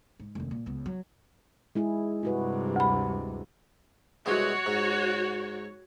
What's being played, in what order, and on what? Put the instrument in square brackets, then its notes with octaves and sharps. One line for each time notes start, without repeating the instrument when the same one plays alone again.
[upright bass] G#2
F1 D#2
A#2
C#2 B3
F#3
[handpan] G#3 E4 G#4
[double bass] G2 C3 [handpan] E4 F#4 B4
[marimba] D2 B5
[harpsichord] C2 B2 G#3 [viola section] F#4 C#5
[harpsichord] G#2